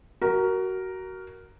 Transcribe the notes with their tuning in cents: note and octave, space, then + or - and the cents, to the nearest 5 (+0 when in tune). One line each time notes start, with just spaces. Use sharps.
F#4 +20 A#4 +0